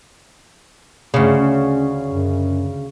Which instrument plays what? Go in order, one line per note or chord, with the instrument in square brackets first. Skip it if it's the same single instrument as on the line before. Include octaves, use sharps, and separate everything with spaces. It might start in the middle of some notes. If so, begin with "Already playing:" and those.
[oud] D2 C#3 [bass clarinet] G2
[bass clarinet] C#4
F#2